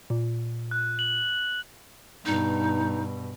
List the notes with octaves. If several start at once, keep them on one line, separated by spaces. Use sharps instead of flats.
A#2
F#6
F#7
G2 B2 D#4